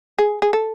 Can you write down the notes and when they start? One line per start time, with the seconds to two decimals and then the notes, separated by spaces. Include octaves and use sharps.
0.18 G#4
0.42 G#4
0.53 A4